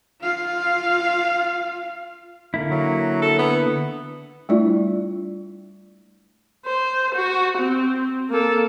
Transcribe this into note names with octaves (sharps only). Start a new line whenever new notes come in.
F4 F5
D3 A#3 E4
F#3
A4
B3
G3 A3 D4 E4 F4 D5
C5
F#4
C4
A#3 A4